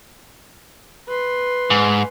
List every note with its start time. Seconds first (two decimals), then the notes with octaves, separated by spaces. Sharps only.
1.08 B4 C6
1.70 G#2